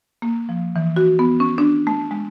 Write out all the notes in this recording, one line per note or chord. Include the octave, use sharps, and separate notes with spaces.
A#3
F3
E3
F#4
B3
C#4
D4
A3
G#3